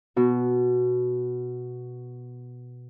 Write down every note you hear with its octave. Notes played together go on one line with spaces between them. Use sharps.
B2 F#4